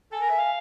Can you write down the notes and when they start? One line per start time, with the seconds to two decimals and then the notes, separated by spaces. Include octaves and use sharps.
0.12 A4 G#5
0.21 A#4
0.29 E5
0.38 F5